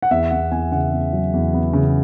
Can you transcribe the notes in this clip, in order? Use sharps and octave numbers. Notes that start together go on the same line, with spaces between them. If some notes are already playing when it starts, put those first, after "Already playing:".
F#5
E2 E5
E2 F#5
E2 G#5
C#3 F#5
B3
F#3
E2
B3
C#3